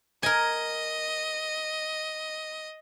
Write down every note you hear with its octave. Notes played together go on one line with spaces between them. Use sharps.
A#4 D#5 G#5